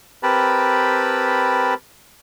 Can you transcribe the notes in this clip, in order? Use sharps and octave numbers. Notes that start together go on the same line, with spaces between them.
C4 G4 A#4 B4 A5 B5